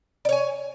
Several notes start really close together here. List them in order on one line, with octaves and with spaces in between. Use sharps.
D5 C#5 G#5